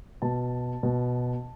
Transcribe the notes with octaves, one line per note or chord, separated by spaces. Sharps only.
B2 A5
B2